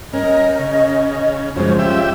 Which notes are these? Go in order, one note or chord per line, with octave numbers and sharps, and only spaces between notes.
C#4 A#4 D#5
C#3
F#2 C#3 F3 G#3 C#4 C5
F4 G4 E5